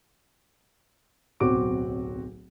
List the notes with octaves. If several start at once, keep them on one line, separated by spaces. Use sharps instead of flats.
D1 B1 C4 F#4 D6 D7